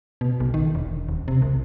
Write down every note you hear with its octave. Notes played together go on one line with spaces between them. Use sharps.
B2
B1
D#3
E1
D#1
C3
C2